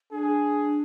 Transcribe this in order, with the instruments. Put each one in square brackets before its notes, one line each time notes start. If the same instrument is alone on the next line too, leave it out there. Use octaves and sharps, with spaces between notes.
[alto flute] D4 [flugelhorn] G#4